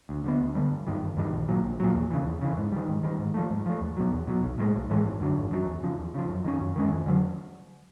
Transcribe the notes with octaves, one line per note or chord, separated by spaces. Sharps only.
D2
D3 G3 B3
D2
D3 G3 B3
G1
G2 D#3 G3
G1
G2 D#3 G3
A#1
A#2 F#3
A#1
A#2 F#3
E2
C#3 E3
E2
C#3 E3
G#2
D#3 G3
G#2
D#3 G3
G#2
F3 A3
G#2
F3 A3
E2
B2 F#3
E2
B2 F#3
B1
A2 E3 G#3
B1
A2 E3 G#3
G#1
F#2 D3 F#3
G#1
F#2 D3 F#3
E2
C#3 F3
E2
C#3 F3
F#2
D#3 G#3 C#4
F#2
D#3 G#3 C#4
F2
D3 F#3